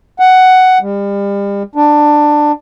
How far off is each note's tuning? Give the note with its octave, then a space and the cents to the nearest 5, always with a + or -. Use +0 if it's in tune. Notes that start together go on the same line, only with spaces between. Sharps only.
F#5 +10
G3 +35
D4 +15